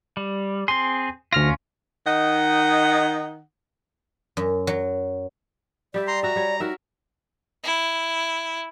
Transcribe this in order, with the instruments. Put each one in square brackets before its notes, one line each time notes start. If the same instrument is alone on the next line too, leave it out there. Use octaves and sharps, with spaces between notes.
[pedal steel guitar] G3
[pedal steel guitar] C4 G#4 [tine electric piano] C6
[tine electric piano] D2 F6 A#6 [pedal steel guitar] C#4 F4
[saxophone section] D#3 D#4 F#5
[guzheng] F#2
F#3
[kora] G3 G4 E5 [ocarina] D5
[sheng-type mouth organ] A#5 C6
[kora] F#4 E5 [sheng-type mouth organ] A#5
[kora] G3 C#5
[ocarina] D#4 [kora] F#4 A#4 E5
[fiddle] E4